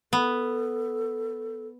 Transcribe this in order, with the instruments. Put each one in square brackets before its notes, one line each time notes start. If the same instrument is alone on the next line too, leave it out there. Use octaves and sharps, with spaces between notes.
[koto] B3 [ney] A4